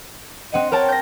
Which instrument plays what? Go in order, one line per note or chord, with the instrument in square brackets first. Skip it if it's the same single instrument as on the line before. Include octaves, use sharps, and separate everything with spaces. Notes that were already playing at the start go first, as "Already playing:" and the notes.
[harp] C4 F#5 D#7 [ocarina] D#5
[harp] A#4 G5 A5 [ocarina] C#5
[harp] G6 A#6